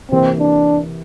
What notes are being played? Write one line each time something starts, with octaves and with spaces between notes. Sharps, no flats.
C3 E3 A#3 C4
D4